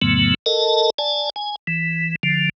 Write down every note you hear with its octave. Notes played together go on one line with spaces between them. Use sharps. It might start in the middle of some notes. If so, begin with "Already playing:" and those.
F2 A2 C#3 F#3 A3 B3
A4 A#4 D#5 A5
D5 G#5 A5
G#5
E3
D3 F3